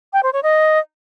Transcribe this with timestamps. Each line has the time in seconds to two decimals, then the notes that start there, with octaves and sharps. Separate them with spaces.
0.13 G5
0.23 C5
0.33 C#5
0.43 D#5